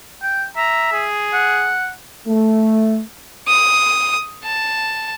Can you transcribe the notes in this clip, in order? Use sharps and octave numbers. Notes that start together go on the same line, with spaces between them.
G5
E5 A#5
G#4
F#5
A3
D#6
A5